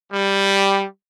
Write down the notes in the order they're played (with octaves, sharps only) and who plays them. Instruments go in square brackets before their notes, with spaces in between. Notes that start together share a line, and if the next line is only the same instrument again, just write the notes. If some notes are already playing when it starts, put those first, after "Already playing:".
[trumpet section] G3